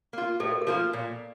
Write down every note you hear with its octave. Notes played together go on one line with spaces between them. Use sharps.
A#3 F4
A2 A4
A#4
A4
F3 A#3 F4
A#2